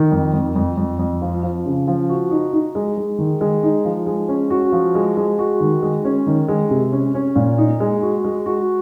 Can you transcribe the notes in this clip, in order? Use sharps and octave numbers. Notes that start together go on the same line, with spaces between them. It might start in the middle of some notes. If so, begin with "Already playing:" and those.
Already playing: D#3
F2
F2
F2
F2
F2
F3
F3
C#3
F3
F#4
D#4
D#4
G#3
G#3
D#3
G#3
D#4
F3
G#3
C#4
F#4
F3
G#3
G#3
F#4
D#3
G#3
C#4
D#3
G#3
C3
C#4
C#4
A#2
D#4
G#3
F#4
G#3
F#4